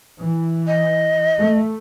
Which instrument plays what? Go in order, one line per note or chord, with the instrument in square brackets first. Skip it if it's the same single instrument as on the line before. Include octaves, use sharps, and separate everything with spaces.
[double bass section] E3
[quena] D#5
[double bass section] A3